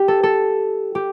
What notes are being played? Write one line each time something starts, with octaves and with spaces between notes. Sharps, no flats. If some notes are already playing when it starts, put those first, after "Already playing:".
Already playing: G4
A4
A4
G4